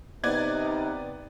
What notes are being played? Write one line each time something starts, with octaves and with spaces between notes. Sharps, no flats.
C3 B3 D#4 D5 G#6